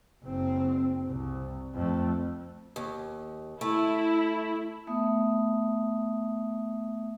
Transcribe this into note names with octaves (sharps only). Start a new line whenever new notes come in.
F#1 C4
C2
F2 A3
D#2
A3 E4
A3 B3 E5 D#6